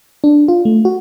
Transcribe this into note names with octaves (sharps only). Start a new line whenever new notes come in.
D4
F4
A3
F#4